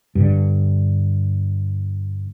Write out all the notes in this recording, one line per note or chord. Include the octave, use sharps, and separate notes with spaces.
G2 D3